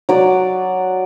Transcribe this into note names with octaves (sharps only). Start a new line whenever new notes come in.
F#3 D5